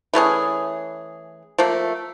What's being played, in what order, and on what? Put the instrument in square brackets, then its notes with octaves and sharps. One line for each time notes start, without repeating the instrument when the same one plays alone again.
[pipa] E3 A3 C#4 G#4
F3 A3 A#3